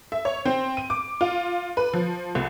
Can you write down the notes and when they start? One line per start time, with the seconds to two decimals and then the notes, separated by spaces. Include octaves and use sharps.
0.12 E5
0.25 C#5
0.45 C4
0.77 D#7
0.90 D6
1.21 F4
1.77 B4
1.93 F3
2.35 C2